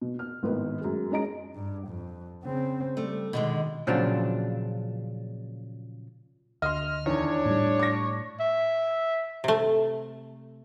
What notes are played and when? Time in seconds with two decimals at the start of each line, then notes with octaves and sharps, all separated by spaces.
0.01 B2
0.19 F6
0.43 G#1 A2 D#3 B3 B4
0.81 F#2 G#3
1.11 G#3 C#4 D#5 A#5 D7
1.54 G2
1.88 F2
2.44 C#3 C4
2.97 G3 A3
3.33 B2 D3 D#3 G#3
3.87 A#2 C#3 F3 F#3 C4 D4
6.62 D2 D#5 C6 F6
7.06 E2 D#3 D4 C#5
7.46 A2 G3
7.79 D6 A#6
8.39 E5
9.44 C3 A3